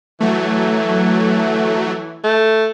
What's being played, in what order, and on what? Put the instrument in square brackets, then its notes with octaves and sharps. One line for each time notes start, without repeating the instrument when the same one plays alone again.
[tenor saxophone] E3 [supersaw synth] F#3 A3
[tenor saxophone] A3